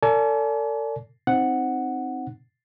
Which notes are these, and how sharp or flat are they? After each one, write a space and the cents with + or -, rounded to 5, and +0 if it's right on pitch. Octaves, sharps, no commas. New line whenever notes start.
A4 +40 D5 -30 G#5 +40
C4 +0 D#4 +0 F#5 +0